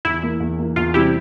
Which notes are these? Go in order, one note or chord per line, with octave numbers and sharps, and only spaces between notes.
E2 E4
E3 A#3
E2
E3 A#3
E2 F4
C3 E3 G3 C4 E4 G4